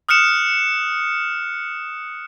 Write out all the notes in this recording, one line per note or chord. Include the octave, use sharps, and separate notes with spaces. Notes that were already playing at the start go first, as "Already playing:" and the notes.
D#6 F6 F#6 C#7 E7